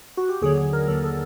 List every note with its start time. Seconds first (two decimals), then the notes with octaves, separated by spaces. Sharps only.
0.17 F#4
0.29 G4
0.41 D#2 D3 F#3 G#4
0.58 G#4
0.73 A#4
0.88 D#2 D3 F#3 A4
1.04 A4